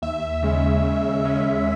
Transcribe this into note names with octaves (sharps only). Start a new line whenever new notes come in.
D#2 E5
C#3 G#3 C#4
D#2
C#3 G#3 C#4